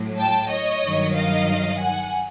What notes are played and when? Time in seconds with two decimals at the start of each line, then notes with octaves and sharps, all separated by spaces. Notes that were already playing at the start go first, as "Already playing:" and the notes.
Already playing: A2 F#3
0.18 G5 A5
0.50 C#5 D#5
0.82 G2 D#3 F#3
1.14 D#5 F5
1.78 F#5 G#5